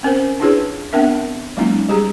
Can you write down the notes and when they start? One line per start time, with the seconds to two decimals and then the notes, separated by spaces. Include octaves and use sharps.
0.03 C4 C#4 A#4 C5
0.40 D4 E4 F4 G#4 B4 C#5
0.93 B3 C4 D4 A#4 E5
1.57 F#3 G#3 A#3 C#4 D#4 F4
1.89 G3 G4 G#4 A#5